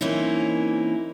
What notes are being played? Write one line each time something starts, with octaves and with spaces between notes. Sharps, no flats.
E3 A#3 C4 C#4 D#4 E4